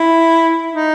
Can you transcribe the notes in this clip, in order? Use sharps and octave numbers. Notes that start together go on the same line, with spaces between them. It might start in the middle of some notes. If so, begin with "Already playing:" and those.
Already playing: E4
D#4